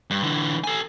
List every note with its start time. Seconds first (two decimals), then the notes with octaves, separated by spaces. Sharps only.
0.10 G2
0.23 D3 E3
0.64 A4 G#5